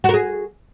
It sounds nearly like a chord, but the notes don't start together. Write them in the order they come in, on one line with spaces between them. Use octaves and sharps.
F#4 A#4 G#4